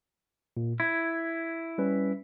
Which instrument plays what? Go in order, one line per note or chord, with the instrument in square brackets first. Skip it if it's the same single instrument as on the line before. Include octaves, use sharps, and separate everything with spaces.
[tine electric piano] A#2
[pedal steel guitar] E4 [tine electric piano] G#6
[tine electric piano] G3 C#4 B4